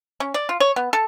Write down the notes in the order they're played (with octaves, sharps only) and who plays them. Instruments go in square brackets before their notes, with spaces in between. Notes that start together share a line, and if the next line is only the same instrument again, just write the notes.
[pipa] C#4
D5
F4
C#5
B3
A4